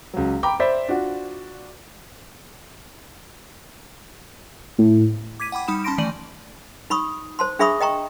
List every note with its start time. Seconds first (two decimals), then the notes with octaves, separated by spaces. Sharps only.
0.14 C#2 F#3
0.43 G5 A#5 B5 D6
0.60 C5 D5 E5 B5 B6
0.88 D4 F4 F#4
4.78 A2
5.40 D6 G#6 B6 D#7
5.52 F#5 G5 B5 D6
5.68 G3 D#4 B5 D#6 E7
5.84 C#4 A5 B5 C6 A#6 D7
5.98 D#3 E3 A3 D5 D#7 F#7
6.90 D#4 B5 C#6 D#6
7.39 C5 A5 C6
7.59 D4 G#4 E5 B5 C#6 D#6
7.81 D#5 G5 A#5 C#6